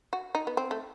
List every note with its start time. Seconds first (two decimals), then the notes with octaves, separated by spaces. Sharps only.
0.13 F#4
0.35 D#4
0.47 B3
0.57 C4
0.71 A3